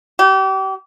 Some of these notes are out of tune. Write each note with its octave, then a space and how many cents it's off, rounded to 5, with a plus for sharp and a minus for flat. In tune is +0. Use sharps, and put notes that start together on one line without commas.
G4 -35